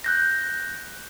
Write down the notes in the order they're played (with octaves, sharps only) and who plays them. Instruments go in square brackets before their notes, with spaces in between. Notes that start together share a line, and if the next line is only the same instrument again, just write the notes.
[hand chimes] F#6 G6 A#6